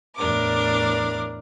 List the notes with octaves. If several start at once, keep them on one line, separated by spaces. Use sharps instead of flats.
E2 A2 D4 A#4 D6